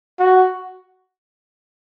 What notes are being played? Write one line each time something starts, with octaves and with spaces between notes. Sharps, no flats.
F#4